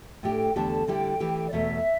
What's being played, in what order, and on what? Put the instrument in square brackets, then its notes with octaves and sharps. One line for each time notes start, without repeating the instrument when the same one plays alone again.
[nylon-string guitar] A2 A3 D4 G4 [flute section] G5
[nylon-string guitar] E2 D3 A3 D4 G4 [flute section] A5
[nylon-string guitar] D3 G3 E4 G4 [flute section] G5
[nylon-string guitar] E3 A3 G4
[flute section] D5
[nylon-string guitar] E2 B2 A3 [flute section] E5